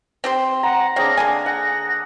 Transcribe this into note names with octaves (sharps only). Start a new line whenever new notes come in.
C4 G4 C5
F#5 A#5
C4 D4 G#4 C#5 F5 A#6
D3 A#3 G#5
F#5 A#6